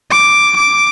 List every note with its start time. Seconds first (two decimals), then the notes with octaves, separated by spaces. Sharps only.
0.11 D6
0.56 D6